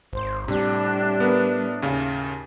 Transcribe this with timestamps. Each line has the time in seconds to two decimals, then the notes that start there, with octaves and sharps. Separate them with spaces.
0.13 G#1 C5
0.48 A2 C3 G3 D4
1.20 B3 A#4 B4
1.82 D#2 C#3 F5